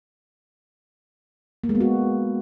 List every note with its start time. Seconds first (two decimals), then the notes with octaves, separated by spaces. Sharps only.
1.64 A#3
1.69 G#3
1.75 B3
1.81 F#4